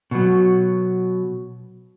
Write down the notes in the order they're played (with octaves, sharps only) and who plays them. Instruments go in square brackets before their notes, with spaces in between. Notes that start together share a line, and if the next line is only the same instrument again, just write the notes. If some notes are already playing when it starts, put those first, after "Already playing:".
[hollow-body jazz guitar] B2 F#3